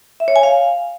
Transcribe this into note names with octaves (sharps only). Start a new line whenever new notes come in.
E5
C#5
G#5
F5